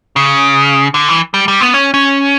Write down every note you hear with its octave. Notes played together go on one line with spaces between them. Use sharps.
C#3
D3
E3
G3
G3
B3
C#4
C#4